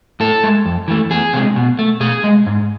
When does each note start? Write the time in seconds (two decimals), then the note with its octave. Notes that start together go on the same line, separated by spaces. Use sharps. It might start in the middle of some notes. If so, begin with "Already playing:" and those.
0.20 A2 A4
0.43 G#3
0.65 F2
0.88 E3 A3
1.11 E2 G#4
1.33 C3 G#3
1.56 B2
1.79 A3
2.00 B2 G#4
2.24 G#3
2.47 G#2